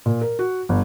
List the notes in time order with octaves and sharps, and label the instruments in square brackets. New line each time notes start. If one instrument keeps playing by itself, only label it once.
[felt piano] A#2
A#4
F#4
G1